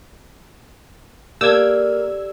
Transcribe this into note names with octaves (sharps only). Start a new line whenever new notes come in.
A#3 G4 A4 D5 E6 G#6